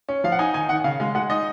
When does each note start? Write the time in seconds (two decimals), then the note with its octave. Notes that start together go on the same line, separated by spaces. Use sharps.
0.09 C#4
0.24 F3 F5
0.32 F#5
0.39 D#4 G#5
0.54 D#3 G#5
0.69 D#3 F#5
0.84 C#3 F5
1.00 G#3 F5
1.15 G#3 F#5
1.30 D#4 D#5